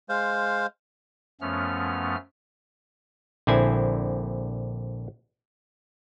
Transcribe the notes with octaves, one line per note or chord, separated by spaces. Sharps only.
G#3 C5 F5
F#2 F3 A3 B3 C#4 F6
A#1 D3 C4 E4 G#5